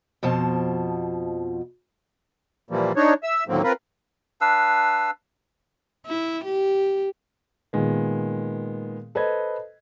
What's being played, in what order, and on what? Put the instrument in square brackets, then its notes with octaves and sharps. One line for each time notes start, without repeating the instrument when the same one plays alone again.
[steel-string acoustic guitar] F2 B2 F3 A5
[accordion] A#2 E3 F3 G3 A#3
D4 D#4 C#5
E5 E6
D#2 A2 D3 F#3 A#3 C4
C4 F4 A#4 B4
[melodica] D4 B4 F5 E6
[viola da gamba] E4
G4
[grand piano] A#2 D#3 G#3 B3
A4 B4 C5 D#5 G#6